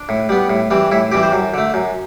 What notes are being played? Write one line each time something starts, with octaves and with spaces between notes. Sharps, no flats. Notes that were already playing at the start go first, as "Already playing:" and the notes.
Already playing: D4
A2
G3 B3
A2
E3 G3 C4
A2 E4
E3 G3 C4 G4
C5
F#2
D3 A3
F#2